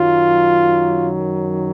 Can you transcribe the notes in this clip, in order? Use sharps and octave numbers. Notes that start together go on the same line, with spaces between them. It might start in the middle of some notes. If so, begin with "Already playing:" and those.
Already playing: F#2 D#3 F#3 F4